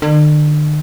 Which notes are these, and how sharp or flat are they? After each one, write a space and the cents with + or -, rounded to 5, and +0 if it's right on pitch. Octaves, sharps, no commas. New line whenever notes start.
D3 +40